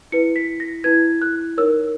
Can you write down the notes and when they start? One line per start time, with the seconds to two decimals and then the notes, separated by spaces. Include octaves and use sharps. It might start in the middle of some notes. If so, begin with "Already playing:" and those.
0.12 E4 B4 C#7
0.36 B6
0.60 A#6
0.84 E4 B4 G#6
1.22 F#6
1.58 D#4 A#4 C#5 E6